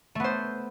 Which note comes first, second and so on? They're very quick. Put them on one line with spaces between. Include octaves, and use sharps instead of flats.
A3 B3 C5